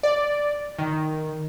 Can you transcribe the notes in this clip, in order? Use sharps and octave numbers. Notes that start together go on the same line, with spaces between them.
D5
D#3